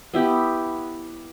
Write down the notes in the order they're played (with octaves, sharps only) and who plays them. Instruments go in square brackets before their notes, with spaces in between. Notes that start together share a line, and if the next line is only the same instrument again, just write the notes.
[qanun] B3 E4 G4